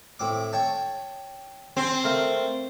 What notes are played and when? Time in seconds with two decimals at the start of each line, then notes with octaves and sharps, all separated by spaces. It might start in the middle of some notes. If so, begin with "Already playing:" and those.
0.19 A2 C4 D6
0.53 C#5 G5 A5
1.77 C4 G#5 C6
2.04 A3 A#3 F5